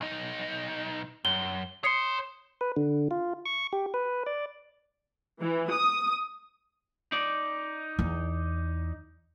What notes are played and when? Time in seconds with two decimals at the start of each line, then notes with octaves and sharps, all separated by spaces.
0.01 B1 D#4
1.25 F#2 G7
1.84 C#5 C6 D#6 C7 C#7
2.61 B4
2.76 D3
3.11 F4
3.46 C#6
3.73 G4
3.94 B4
4.26 D5
5.41 E3
5.71 D#6
7.12 D#4 D5
7.99 E2 E4